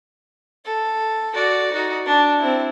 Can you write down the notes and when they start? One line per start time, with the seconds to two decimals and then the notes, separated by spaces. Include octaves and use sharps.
0.65 A4
1.34 F#4 D5
1.72 D#4 F#4
2.06 D4
2.39 C4 E4